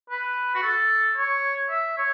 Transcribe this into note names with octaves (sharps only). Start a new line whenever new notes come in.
B4
F#4
A4
C#5
E5
C#5